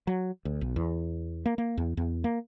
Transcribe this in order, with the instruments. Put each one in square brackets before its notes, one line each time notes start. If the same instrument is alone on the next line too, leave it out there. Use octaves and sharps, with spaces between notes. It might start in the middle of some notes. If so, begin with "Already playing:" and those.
[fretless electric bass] F#3
D2
B1
E2
A#3
A#3
E2
E2
A#3